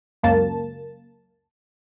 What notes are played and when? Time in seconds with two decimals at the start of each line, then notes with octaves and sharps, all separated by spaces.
0.23 C#2 F#2 A#3 A5